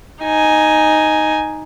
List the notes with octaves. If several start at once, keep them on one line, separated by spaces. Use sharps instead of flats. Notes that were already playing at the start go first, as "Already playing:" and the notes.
D#4 G#5